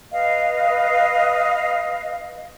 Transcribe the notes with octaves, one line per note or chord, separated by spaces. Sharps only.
B4 D#5 F5